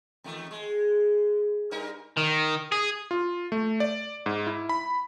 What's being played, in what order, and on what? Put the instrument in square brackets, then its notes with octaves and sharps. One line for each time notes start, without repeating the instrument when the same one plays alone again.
[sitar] E2 D#3 A3
G#3
G2 D#4 A#4
[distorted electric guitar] D#3
G#4
[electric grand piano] F4
A3
D5
G#2
E4
B5